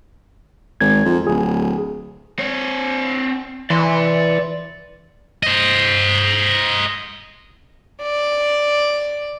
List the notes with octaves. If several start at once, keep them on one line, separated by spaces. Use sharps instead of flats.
G#1 G#6
F2
D1 G#4
C4 C#5
E3 D5 C6
C5 D#5
D5